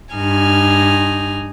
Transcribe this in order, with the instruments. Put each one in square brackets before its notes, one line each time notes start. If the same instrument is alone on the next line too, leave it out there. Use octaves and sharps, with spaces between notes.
[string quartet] G2 D#4 G#5 F6